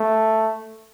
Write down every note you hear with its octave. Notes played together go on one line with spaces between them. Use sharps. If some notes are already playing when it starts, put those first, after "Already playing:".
Already playing: A3